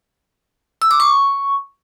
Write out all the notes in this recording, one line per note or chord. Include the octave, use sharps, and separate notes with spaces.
E6
D6
C#6